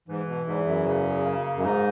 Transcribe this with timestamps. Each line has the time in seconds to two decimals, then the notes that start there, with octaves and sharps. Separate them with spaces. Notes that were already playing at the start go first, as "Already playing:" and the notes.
0.09 G#2 E3
0.28 B2
0.47 E2 G#2
0.66 F#2
0.86 C#3
1.25 A#3
1.56 F#2
1.64 G#2 D#4